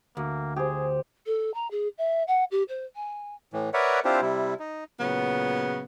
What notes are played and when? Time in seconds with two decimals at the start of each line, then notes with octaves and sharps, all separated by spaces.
0.17 D2 A#3
0.56 G4 G#4 C5
1.26 A4
1.54 A#5
1.71 G#4
1.98 E5
2.27 F#5
2.51 G4
2.68 C5
2.95 G#5
3.53 A2 E3
3.74 A#4 B4 C#5 D5 E5 F#5
4.05 C4 D4 E4 F4 G4 C5
4.21 C3 G3 E4
4.59 D#4
5.00 A#2 C#3 F#3 B3